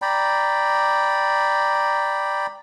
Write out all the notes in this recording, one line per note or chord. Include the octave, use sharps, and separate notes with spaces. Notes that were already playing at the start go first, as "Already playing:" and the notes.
D5 G5 A#5 B5